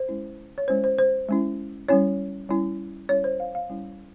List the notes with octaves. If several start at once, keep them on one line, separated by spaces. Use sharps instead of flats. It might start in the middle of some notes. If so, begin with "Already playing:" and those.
Already playing: C5
G#3 C#4 E4
C#5
G#3 C#4 E4 C5
C5
C5
G#3 C#4 E4
G3 C#4 E4 C#5
G3 C#4 E4
G3 C#4 E4 C#5
C5
F5
F5
G3 C#4 E4